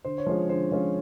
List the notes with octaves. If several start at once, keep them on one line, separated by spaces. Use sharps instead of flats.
D3 C5
C#5
F3 G#3 C#4 F4 C5
D3 C5
F3 G#3 C#4 F4